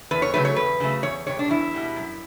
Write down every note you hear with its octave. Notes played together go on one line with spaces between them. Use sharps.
E2 B4
C#5
C#3 F#3 A3 B4
C#5
E2 B4
C#3 F#3 A3
E2 C#5
B2 G3 C#5
D4
E2 E4
B2 G3
F#2